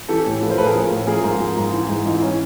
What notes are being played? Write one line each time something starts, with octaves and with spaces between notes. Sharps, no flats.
E3 G4 A4
A2
F3 A4 B4
A#4 C5
A2 A4 B4
G#4 A#4
F3
A2
F3 G#4 A#4
G#2
F3
G#2
E3
G#2
E3 D#4 F4
E4
C#4 D#4